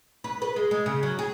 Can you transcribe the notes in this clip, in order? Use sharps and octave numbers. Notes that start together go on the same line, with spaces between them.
B4
B4
G#3
G#3
C#3
F#3
G#4